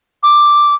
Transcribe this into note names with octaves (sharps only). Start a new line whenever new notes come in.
D6